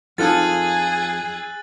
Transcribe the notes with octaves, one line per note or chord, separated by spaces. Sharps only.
F2 D#4 F4 G#4 A4 E6 F#6 A6